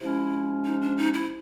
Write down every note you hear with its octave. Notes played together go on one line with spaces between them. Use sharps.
C3 F3 G#3 C#4 E4
D#4
D4
D#4
E4